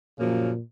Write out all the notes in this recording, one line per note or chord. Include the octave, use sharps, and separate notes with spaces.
F#2 A#2 C#3 F3 A#3